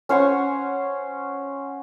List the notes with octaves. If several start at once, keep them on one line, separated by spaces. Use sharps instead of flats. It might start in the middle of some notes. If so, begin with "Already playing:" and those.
C#4 C5 F#5 C#6